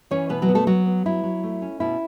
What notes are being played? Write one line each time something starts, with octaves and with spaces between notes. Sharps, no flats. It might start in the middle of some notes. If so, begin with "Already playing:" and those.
E3 C#4 C#5
B2 B3 B4
F#3 F#4
B3
A3 A4
F#3 B3 F#4
B3
F#3 E4
F#3
A3
C#4
B2 E4